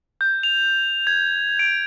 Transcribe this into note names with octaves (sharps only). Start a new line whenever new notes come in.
G6
F7
G#6
D7